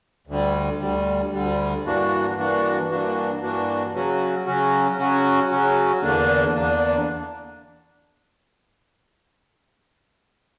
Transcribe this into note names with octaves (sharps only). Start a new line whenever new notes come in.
D2 D3 G3
D2 D3 G3
D2 D3 G3
G2 E3 A#3 D4 F#4
G2 E3 A#3 D4 F#4
G2 E3 A#3 D4 F#4
G2 E3 A#3 D4 F#4
C#3 F#3 C#4 F#4
C#3 F#3 C#4 F#4
C#3 F#3 C#4 F#4
C#3 F#3 C#4 F#4
E2 D3 A#3 D4
E2 D3 A#3 D4